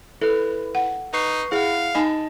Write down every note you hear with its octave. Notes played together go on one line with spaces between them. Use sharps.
E4 A4 B4
F#5
D#4 B4 C#6 C7
E4 G#4 F5 F#5
D#4 D#5 G#5 A5 B5